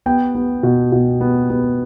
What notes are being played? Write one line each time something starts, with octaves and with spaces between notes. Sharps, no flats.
B3 G5
B3
B2
B2
B3
B3